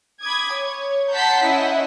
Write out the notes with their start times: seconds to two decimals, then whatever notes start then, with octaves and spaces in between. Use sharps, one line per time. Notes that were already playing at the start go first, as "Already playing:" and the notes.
0.24 B5 D6 D#6 G#6
0.52 C#5
1.11 F#5 A5 A#5 C6 G6 B6
1.43 C#4 E4 D#5 E5 F#5